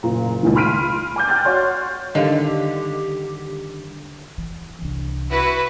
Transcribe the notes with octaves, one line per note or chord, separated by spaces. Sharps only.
F#1 A#2 A#5
C#2 A#2 D#3
B5 C6 F6 B6 D7 D#7
G#5 D6 G6
G5 F6 F#6 A6
F#4 C#5 C6
D3 D#3 G3 G4 D#5 F5
E3
C2 D4
E4 F#4 B4